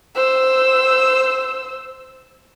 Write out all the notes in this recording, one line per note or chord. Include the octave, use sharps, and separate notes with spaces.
C5 E6